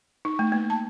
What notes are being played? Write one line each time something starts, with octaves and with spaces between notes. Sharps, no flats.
D#4
A3
A#3
A5